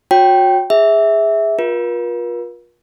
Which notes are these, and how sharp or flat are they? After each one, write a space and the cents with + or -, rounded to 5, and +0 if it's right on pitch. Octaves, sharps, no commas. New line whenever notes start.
F#4 -30 C#5 -15 G5 -10
G#4 -10 E5 -10
F4 +25 A#4 +45